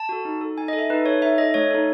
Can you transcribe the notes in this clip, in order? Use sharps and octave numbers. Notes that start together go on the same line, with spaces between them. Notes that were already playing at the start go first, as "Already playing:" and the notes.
Already playing: A5
F#4 A4
D#4
A4
D#4 G#5
D#5
A4
E5
D#4 B4
A4 C#5
D#4 E5
A4 D#5
A3 C#5
D#4 A4